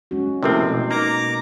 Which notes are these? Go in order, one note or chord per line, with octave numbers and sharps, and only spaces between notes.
G#3 C#4 F#4
C3 F3 A3 A#3 C4 E4
B2
A#3 D#4 A#5 D6